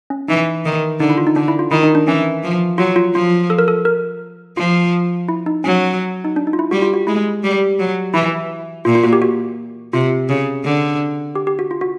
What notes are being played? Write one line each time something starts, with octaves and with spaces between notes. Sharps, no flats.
C#4
E3 D#4
D#3
D3 D#4
E4
F4
D#4
D3 D4
E4
F4
D#3 E4
D#4
D4
E3 C#4
F3
F#3 F4
F4
F3 F4
A4
A#4
A4
A#4
F3 F4
E4
D#4
F#3 C#4
D#4
D4
D#4
F4
E4
G3 F#4
F4
F#4
G#3 E4
G3
F#3
E3 E4
A#2 F4
F4
F#4
G4
F#4
C3 F4
C#3
D3
G4
G4
F#4
F4
F#4